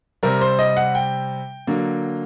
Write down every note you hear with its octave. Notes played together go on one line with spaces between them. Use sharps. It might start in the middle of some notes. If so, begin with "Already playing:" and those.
C3 G3 C4 A#4
C5
D#5
F#5
G5
D3 F#3 A#3